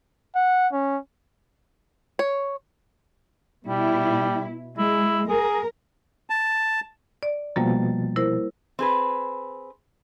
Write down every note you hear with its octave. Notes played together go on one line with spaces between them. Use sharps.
F#5
C#4
C#5
B2 G3 E4
G#3 E4
G#4 A#4
A5
D5
B2 F3 G3 A#3 A6
E4 A#4 C5
C4 G#4 B4